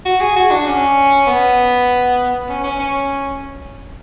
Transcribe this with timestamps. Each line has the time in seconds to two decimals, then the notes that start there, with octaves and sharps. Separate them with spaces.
0.05 F#4
0.21 G#4
0.36 F#4
0.51 D4
0.66 C#4
1.27 B3
2.49 C#4
2.64 C#4
2.79 C#4